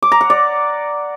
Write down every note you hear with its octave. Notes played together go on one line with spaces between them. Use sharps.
D6
A#5
F#5
D5